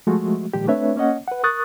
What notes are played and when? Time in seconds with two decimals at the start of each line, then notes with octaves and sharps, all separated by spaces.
0.07 F3 G#3 A3 F#4
0.54 A#2 D#3 F3 G#3 G4
0.67 A3 C4 D4 B4 C#5 E5
0.96 A#3 C#4 C#5 D#5 F#5
1.28 B4 F#5
1.43 A#4 C#6 D#6 F#6 A6